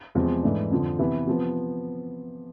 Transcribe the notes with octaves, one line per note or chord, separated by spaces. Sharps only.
E2 C3 F3 G#3 C4
G#2 E3 A3 D4
F2 D3 F3
C3 E3 B3 E4
C3 F3 B3